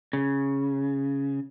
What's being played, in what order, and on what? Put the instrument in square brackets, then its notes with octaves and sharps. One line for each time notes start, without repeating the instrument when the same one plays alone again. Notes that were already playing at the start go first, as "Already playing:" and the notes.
[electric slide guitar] C#3